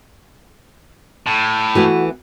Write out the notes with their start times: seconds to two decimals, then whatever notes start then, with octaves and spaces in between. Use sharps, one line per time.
1.27 A2
1.75 E3 A3 B3 F#4